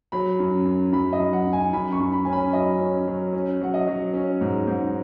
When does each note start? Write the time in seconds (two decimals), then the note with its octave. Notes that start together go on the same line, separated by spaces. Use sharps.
0.12 F#3 B5
0.39 F#2
0.65 F#2
0.92 F#2 B5
1.13 D#5
1.20 F#2
1.33 F#5
1.46 F#2
1.53 G#5
1.73 F#2 B5
1.93 C#6
2.00 F#2
2.13 B5
2.25 C#4 G#5
2.33 B5
2.53 F#3 D#5
2.79 C#4
3.07 F#3
3.33 C#4
3.61 F#3 F#5
3.74 D#5
3.87 F#3
4.13 C#4
4.41 G#2
4.67 G#2